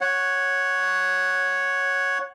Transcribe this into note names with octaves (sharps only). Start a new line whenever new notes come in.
C#5 F#5